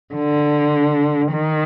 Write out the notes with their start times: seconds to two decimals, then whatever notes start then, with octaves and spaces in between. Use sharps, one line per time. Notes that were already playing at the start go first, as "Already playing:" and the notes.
0.14 D3
1.33 D#3